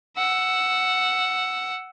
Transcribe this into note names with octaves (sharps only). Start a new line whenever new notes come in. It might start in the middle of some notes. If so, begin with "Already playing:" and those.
F#5 E6